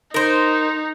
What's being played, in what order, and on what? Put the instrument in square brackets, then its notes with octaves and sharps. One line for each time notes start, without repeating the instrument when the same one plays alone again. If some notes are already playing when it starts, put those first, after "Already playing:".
[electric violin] D#4 [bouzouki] A#4 C5